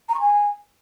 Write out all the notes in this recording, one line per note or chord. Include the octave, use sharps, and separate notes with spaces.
A#5
C#6
G#5